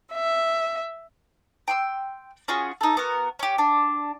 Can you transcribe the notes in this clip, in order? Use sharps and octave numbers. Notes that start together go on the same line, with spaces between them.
E5
G5 C6 E6
C#4 F4 F#4 G#4
D#4 A4
B3 F#4 A#4
C#4 G4
D4